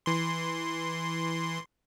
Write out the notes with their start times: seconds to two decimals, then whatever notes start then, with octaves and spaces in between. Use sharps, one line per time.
0.06 E3 C6